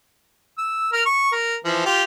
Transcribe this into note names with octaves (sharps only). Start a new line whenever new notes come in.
E6
A#4 F6
C#6
A#4
E3 F3
F4 G4